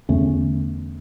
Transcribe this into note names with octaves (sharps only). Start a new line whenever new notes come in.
E2 D3 A3 C#4